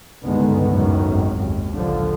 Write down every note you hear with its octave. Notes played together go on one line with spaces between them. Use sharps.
C#2 G2 D3 D#3 G#3 B3
F#2 A2 D#3 F#3
G#1 F#2
D#2
A#1 D3 F3